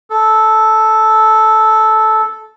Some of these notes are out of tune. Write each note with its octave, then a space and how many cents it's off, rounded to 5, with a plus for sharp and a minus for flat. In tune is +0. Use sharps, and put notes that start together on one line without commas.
A4 -10